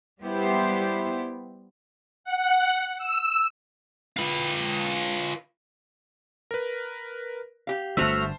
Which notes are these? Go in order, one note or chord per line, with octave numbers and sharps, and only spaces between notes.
G3 B3 E4 G4 C5
F#5
E6
F4 B4
A#4 B4
G4 F5
G1 D3 A3 F#4 C5 E5 A5 F6